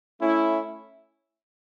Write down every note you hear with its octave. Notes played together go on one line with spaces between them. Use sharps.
A3 C#4 E4